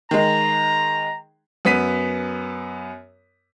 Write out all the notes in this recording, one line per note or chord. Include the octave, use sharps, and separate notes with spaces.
D#3 G#3 A#5
F#2 B3 B6 D#7